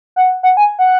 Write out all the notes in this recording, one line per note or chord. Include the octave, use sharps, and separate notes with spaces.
F#5
F#5
G#5
F#5